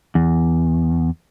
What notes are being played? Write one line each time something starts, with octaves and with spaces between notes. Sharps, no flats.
E2